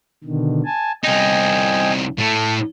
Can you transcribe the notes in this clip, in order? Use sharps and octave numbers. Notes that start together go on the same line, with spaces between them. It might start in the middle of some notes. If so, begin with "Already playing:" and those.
B2 D3 D#3
G#5 A5
C2 D#4 D#5 G5 G#5
A2 A3 A5